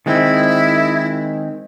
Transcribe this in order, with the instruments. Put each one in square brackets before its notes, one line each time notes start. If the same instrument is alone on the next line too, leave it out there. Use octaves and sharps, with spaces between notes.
[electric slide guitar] D#3 G#3 C4 [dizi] E4